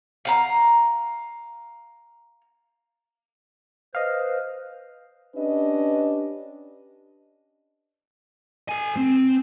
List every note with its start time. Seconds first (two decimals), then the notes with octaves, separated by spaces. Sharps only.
0.25 F5 F#5 A#5
3.95 B4 C5 D#5 F5
5.35 C#4 D4 G4 B4 D#5
8.69 A4 G#5
8.97 C4